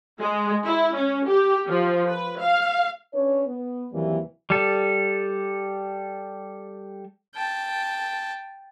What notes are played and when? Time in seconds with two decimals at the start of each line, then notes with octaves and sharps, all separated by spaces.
0.20 G#3
0.66 E4
0.97 C#4
1.29 G4
1.68 F3
2.11 B4
2.41 F5
3.14 C#4 D4 B4 C#5
3.47 B3
3.93 D#2 C3 E3 F#3 G3 A#3
4.50 G3 A4
7.35 G5 A5